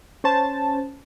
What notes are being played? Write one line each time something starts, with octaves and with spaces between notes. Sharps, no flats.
C#4 C5 A5